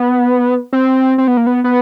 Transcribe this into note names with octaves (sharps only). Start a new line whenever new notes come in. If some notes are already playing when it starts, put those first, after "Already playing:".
Already playing: B3
C4
C4
B3
A#3
B3
B3